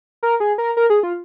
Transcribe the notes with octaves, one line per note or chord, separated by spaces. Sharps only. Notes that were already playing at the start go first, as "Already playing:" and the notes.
A#4
G#4
A#4
A#4
G#4
F4